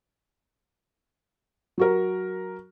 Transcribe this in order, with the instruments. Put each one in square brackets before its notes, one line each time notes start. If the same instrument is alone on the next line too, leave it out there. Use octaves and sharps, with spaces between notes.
[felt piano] F#3 F#4 A#4